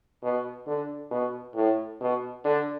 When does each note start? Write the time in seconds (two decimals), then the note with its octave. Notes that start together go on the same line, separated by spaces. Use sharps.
0.23 B2
0.67 D3
1.11 B2
1.55 A2
2.01 B2
2.44 D3